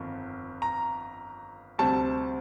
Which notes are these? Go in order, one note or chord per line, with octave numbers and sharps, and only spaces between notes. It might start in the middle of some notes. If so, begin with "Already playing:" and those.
Already playing: G1 F2 D#3
A#5
D2 C3 G3 C4 A5